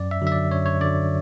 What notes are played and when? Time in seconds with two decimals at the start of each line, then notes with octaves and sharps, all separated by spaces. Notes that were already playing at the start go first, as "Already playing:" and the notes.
Already playing: F#2 D5
0.11 E5
0.22 D3 F#3 E5
0.32 D5
0.51 F#2 C#5
0.66 C#5
0.81 D3 F#3 D5